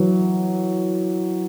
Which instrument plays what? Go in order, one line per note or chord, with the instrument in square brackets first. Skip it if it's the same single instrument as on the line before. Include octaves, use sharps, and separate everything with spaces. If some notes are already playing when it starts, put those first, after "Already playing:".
Already playing: [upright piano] E3 F#3